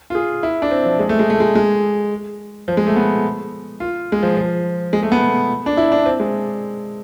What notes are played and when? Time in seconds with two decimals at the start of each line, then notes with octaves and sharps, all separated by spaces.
0.10 F4
0.15 G#4
0.43 E4
0.62 D4
0.71 C4
0.85 F3
0.99 G#3
1.09 A3
1.19 G#3
1.30 A3
1.40 G#3
1.55 G#3
2.68 F3
2.77 G#3
2.87 A3
2.96 B3
3.80 F4
4.12 G#3
4.23 F3
4.37 F3
4.93 G#3
5.03 A3
5.12 B3
5.66 D4
5.77 E4
5.92 D4
6.06 C4
6.20 G#3